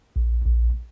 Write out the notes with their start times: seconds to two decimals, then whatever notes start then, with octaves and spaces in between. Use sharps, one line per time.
0.16 A#1
0.44 A#1